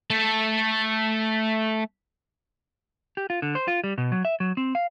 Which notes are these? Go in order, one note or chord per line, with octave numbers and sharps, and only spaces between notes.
A3 A4
G4
F4
D3
C5
F4
G3
B2
F#3
E5
F#3
C4
F5